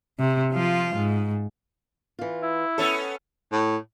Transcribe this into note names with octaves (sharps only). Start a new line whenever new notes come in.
C3
F3 F4
G#2
E3 F4
E4
B3 C#4 A4 C#5
A2